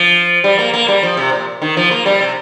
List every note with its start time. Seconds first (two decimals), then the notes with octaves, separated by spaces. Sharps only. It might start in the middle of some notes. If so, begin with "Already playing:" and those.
Already playing: F3
0.44 G3
0.59 A#3
0.73 A#3
0.88 G3
1.03 F3
1.17 C3
1.32 A#2
1.62 D#3
1.77 F3
1.91 A#3
2.06 G3
2.21 C3